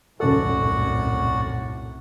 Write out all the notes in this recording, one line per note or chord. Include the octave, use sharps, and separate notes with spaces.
D#1 C2 F#2 A2 F#4 A4 D5 F#5